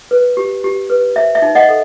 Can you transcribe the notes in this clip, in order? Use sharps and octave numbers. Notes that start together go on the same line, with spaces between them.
B4
G4
G4
B4
C5 E5
E5
D#4
D#5 F#5
A4